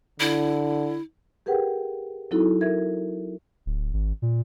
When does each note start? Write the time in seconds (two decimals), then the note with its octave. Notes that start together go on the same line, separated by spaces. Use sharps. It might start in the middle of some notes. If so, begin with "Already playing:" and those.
0.20 D3 E4
1.46 G4 G#4 A#4 B4 F#5 G5
2.31 F#3 C4 D#4 E4 F#4 A4
2.61 A#4 E5 G#6
3.66 D1
3.93 G#1
4.22 A#2